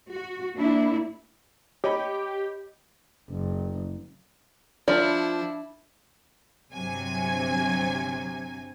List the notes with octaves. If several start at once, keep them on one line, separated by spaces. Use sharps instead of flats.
F#4
A#3 D4 E4
G4 C#5 D#5 B5
F#1
F3 D4 E4 D5
G1 C3 F#3 G#5